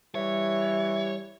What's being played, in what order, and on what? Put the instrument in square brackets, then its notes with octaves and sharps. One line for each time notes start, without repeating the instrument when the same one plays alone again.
[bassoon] E3 [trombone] G3 [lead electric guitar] C#5